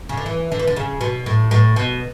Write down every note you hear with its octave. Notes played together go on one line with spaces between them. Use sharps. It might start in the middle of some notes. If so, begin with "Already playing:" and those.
C#3
D3
E3
D3
E3
D3
C#3
B2
A2
A2
B2